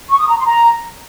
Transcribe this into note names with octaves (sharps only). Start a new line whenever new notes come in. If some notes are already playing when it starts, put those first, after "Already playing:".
C#6
D#6
A#5
C6
A#5